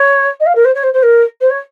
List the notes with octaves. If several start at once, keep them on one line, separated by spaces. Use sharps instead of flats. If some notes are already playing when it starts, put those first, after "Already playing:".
Already playing: C#5
D#5
F5
A#4
C5
C#5
C5
C5
A#4
C5
C#5